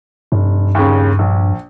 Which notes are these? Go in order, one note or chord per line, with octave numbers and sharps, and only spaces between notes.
F1 G2
D#2 C#3
A#1